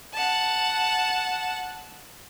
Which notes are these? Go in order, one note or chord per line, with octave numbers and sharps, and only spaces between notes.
F#5 A5